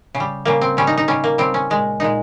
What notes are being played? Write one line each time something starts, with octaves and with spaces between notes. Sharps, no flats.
C#3
G3
C#3 G3 A#3
C4
C#3 G3 C#4
D#4
D#4
C#3 G3 C#4
A#3
C#3 G3 C4
C#4
A#2 G#3
A#2 G#3 D#4